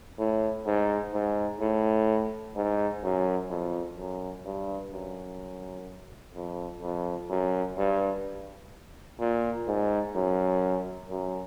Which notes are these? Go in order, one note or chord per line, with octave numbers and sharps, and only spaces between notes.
A2
G#2
G#2
A2
G#2
F#2
F2
F#2
G2
F#2
F2
F2
F#2
G2
A#2
G#2
F#2
F#2